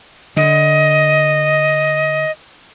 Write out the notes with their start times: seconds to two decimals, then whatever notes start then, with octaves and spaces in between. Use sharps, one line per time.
0.37 D3 D#5